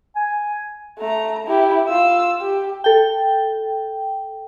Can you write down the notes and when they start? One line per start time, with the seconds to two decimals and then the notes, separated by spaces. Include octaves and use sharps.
0.16 G#5
0.99 A3 A#5
1.47 E4 G4
1.87 F4 E6
2.41 G4
2.84 A4 G5